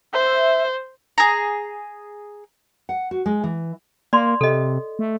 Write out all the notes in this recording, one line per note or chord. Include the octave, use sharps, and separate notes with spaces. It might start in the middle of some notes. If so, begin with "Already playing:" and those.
C5 E5
G#4 A#5
F#5
F#4
G#3
E3
A#3 D5 C6
C3 A4 D#5
A3